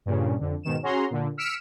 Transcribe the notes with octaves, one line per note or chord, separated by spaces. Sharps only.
G2 A#2 C#3
F2 D3
G#2 B2 D#3 E7
C#4 F#4 G#4 A#5 C6
A#2 D3
E6 F6 B6 C#7 D7 E7